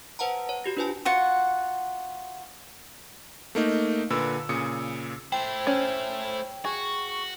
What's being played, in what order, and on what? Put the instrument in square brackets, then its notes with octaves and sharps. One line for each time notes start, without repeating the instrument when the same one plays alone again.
[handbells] B4 C5 F#5 A5 A#5
C#5
F#4 G4 A#6
D4 F4 B4 C5 G#5 A5
[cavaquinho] F4 F#4 F#5
[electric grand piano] A3 A#3 D#4
A#2 D3 B4 E6
A#2 C#3 D#6 C#7
[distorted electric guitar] A3 E4 [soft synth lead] C5 [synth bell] G5
[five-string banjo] C#4
[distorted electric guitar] F#4 [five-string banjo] G#4 [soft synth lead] C#6